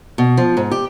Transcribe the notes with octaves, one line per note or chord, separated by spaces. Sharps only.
B2
F3
G#2
G4